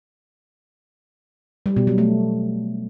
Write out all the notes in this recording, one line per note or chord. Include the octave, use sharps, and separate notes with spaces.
G3
B2
F#3
A3